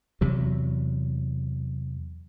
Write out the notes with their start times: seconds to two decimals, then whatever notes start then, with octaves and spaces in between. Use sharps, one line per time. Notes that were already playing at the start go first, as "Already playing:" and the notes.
0.21 E2 C3 F#3